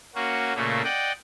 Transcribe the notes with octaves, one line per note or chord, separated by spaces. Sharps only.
A#3 C#4 F#4
A#2 C#3 A3 A#3
D5 D#5 F#5 G5